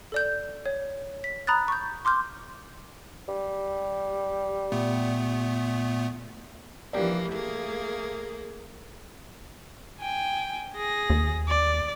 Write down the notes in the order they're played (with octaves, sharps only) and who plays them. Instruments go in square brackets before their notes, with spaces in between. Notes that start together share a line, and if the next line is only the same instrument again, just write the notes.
[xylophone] A4 D5 G6
C#5
B6
A#5 B5 D#6 F#6 A6
C#6 G6
C6 D6 F6 G6
[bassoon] G3
[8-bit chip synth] A#2 A3 B3
[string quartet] E3 F3 A#3 [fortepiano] G4 D5
[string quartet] A3 A#3 G#4
[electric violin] G5 G#5
G#4 A#6
[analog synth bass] D#2
[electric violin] D5